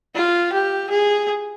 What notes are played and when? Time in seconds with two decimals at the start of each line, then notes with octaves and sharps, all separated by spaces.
0.15 F4
0.53 G4
0.90 G#4